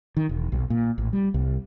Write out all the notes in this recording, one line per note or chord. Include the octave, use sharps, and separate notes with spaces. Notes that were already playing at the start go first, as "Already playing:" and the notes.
D#3
E1
B1
A#2
A1
G3
C2